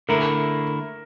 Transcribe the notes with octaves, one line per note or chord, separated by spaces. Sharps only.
D3 A3 E4 A#4